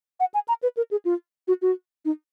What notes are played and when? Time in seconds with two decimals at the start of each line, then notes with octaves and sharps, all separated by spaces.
0.20 F#5
0.34 G#5
0.48 A#5
0.63 B4
0.77 A#4
0.91 G#4
1.05 F4
1.48 F#4
1.62 F#4
2.05 D#4